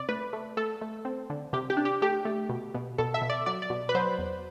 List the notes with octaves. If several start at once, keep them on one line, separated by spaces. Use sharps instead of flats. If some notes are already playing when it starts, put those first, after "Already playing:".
Already playing: C3 D5
A3 B4
A3
A3 A4
A3
C4
D3
C3 G4
G4
D4
G4
A3 G4
A3
B2
B2
B2 A4
E5
B2
D5
F#3 D5
D5
B2
B4
F#3 C5
E2